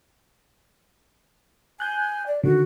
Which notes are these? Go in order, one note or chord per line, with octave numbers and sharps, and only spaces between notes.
G#5 F#6 G6
D5
D3 D#3 F#4